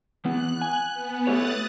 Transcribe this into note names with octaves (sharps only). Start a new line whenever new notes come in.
E3 B3 F#6
G#5
B3
A3 G4 C#5 D#6 F#6 A6